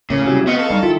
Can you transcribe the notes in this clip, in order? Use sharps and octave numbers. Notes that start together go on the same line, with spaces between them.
A2 C#3 A3 A#3
C3 F#3 G3 E4
B3 C4 D#5 F5 C#6
A4
G2 G3 D#4
D#3 E4 F4